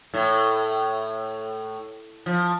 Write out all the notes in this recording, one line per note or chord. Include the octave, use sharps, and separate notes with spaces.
A2
F3